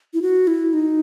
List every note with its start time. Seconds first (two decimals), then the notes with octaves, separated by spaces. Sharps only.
0.14 E4
0.22 F#4
0.47 E4
0.73 D#4